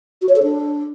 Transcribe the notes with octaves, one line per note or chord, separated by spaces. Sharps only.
F#4
C#5
A4
D4